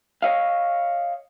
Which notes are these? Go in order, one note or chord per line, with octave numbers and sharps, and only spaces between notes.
C#5 D#5 F5